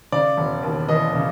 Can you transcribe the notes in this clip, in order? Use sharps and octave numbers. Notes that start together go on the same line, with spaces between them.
C#3 D5
E1
D#2
E3 D#5
C#3